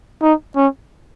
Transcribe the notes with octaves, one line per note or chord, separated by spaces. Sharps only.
D#4
C#4